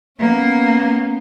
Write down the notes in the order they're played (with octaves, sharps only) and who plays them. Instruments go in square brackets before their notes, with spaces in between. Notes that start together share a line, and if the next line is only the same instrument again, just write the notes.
[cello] A#3 [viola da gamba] B3 C#4